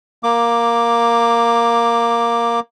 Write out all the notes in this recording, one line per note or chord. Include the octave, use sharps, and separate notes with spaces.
A#3 D6